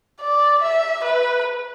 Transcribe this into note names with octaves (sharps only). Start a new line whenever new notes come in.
D5
E5
B4